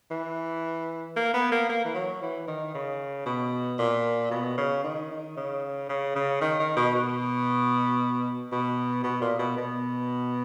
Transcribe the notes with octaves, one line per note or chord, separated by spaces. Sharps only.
E3
A#3
B3
A#3
A#3
E3
F#3
E3
D#3
C#3
B2
A#2
B2
C#3
D#3
D#3
C#3
C#3
C#3
D#3
D#3
B2
B2
B2
B2
A#2
B2
B2